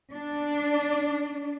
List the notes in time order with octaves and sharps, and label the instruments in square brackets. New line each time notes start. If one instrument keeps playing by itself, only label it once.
[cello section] D4